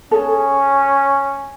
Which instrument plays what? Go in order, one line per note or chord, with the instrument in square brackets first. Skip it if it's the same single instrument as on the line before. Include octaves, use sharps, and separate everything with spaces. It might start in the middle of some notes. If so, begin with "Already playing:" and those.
[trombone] C#4 [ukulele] G#4 A4